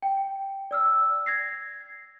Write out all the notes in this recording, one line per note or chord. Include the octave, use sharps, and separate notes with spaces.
G5
D5 E6 F6
G#6 A#6 C7